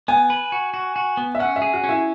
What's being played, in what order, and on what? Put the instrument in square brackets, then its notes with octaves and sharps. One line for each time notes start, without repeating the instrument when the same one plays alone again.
[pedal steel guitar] B3 [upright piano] G#5
[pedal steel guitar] B4
F#4
F#4
F#4
B3
[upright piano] E5
[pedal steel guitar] C#4 [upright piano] F#5
[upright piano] E5
[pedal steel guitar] G#4
[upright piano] F#4
[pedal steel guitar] C#4
[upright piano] E4